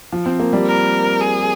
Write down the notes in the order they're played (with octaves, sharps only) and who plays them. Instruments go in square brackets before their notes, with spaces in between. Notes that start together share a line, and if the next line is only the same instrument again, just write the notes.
[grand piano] F3
C4
A#3
G3
[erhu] A#4
G#4